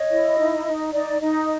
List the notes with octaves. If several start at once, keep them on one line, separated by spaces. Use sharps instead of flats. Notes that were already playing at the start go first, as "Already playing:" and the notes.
Already playing: C#5 D#5
E4
D#4
D#4
D#4 D5
D#4 D#5